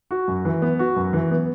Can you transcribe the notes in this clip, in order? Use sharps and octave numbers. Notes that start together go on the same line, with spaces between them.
F#4
F#2
E3
B3
F#4
F#2
E3
B3